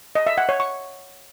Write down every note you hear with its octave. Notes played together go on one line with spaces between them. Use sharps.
D#5
E5
F#5
C#5
C#6